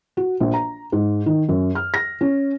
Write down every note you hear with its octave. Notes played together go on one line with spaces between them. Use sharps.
F#4
A#1
A#5
G#2
D#3
F#2
F6
A#6
C#4